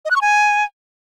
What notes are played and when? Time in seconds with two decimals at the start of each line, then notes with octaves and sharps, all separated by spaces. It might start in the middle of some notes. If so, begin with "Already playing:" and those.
0.05 D#5
0.11 F#6
0.16 C#6
0.21 G#5